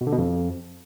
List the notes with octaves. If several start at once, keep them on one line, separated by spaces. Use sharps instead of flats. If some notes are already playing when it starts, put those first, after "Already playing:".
B2
D3
B2
F2